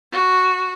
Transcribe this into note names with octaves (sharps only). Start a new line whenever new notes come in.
F#4